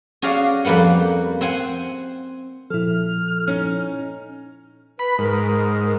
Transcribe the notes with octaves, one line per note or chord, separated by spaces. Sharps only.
C#4 F#4 G#4 D5 F5
F2 G3 A#3 B4 F#5
C4 F#5 G#5
A#2 F3 E4 A4 F6
C#4 D#4
B4 B5
G#2 A#4